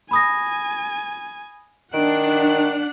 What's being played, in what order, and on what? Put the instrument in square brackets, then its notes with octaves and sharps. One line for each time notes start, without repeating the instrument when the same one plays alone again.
[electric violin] G#5 [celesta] B5 D#6 A#6
[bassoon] D#3 [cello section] D4 [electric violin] F#5 F#6 [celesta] D7